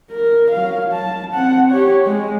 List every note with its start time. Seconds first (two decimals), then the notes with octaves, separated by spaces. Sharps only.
0.11 A#4
0.51 F#3 F5
0.93 A5
1.34 C4 F#5
1.71 G4 C#5
2.05 G#3